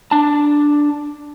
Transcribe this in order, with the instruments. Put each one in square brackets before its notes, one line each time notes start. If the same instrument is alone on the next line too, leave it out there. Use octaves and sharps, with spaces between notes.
[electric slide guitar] D4 A5